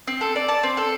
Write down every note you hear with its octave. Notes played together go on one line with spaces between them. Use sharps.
C4
A4
D5
A5
C4
A4